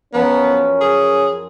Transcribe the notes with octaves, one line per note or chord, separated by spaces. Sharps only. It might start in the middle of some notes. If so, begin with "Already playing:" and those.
F#2 F3 B3 C#4 A#4
G#4